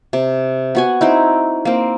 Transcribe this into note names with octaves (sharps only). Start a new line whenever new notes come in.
C3
B3 F#4 G#5
C4 D#4 E4
A#3 C4